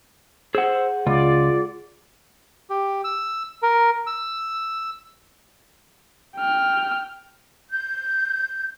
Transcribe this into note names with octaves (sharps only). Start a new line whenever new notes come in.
G#4 C5 F#5 E6
C#2 F4 D5
G4
E6
A#4
E6
G5 F6
G6